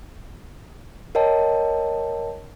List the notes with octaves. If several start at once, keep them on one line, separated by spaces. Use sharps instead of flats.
A#4 C#5 D#5 G5 A5